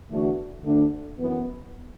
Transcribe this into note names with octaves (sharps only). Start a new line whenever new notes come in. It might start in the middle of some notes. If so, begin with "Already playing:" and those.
E2 D3 A3 D4 F#4
D2 D3 A3 D4
F#2 E3 B3